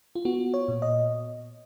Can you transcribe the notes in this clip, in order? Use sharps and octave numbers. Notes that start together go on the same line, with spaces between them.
F4
B3 F#4
C#5
A#2
D#5